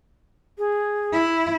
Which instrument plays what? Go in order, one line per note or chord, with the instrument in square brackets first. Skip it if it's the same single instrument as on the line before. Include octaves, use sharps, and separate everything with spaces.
[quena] G#4
[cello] E4